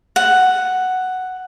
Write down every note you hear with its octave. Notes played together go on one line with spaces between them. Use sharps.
F#5